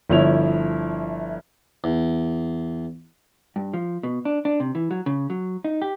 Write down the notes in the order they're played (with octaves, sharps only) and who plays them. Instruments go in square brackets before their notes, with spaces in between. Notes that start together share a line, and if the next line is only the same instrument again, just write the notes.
[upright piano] G1 F3 E4 C#5 F7
[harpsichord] E2
[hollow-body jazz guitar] G2
F3
B2
D4
D4
C3
E3
F#3
C#3
F#3
D#4
G4